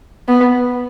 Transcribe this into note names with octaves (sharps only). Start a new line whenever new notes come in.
B3